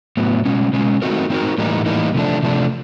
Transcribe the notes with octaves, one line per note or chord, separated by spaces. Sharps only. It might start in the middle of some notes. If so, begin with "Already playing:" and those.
A2 F#3 B3
B2 G#3 C#4
B2 G#3 C#4
A3 C4 D#4 F#4 A#4
A3 C4 D#4 F#4 A#4
A2 E3 G3 A#3 D#4
A2 E3 G3 A#3 D#4
C3 F3 A3 D4
C3 F3 A3 D4